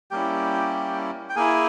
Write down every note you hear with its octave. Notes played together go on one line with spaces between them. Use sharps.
G3 A#3 C#4 E4 G4 G5
G5
A#3 E4 G#4 G#5